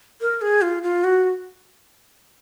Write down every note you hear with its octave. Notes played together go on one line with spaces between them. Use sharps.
A#4
G#4
F4
F4
F#4